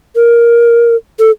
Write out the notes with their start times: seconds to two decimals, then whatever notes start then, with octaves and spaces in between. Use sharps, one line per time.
0.16 A#4
1.19 A4